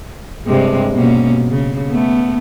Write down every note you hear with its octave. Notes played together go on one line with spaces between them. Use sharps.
G2 C3 G#3
B2 A#3 C#4
C#3
A3 B3